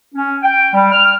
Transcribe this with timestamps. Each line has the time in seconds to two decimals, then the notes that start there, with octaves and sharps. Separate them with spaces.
0.14 C#4
0.43 G5
0.73 G3
0.92 F6